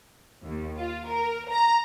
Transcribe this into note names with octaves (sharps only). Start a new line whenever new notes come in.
D#2
F4
A#4
A#5